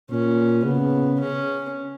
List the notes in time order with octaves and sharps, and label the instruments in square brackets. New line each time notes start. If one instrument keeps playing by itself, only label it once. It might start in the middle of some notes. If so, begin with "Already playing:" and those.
[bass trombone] A#2 [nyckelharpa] C#4
[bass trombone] C#3 [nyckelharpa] B3
[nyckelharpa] C#4